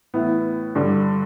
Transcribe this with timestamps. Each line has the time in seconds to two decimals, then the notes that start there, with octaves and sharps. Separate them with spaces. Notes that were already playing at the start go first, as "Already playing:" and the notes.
0.14 A2 E3 B3 E4
0.75 G2 D3 G3